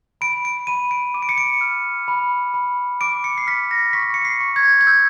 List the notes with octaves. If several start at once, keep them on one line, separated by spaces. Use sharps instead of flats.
B5 D7
D7
B5 D#7
D7
D6 D#7
D7
C#7
D7
F6
B5
B5
D6 D7
C#7
C7
F6 B6
A#6
C#6 B6
C#7
C7
C#6
G#6
G#6
E6 G6